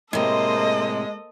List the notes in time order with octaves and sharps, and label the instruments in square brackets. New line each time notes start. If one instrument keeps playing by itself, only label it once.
[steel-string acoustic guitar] A2 C3 [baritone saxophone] G#3 [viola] A#3 C5 [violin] A4 D#5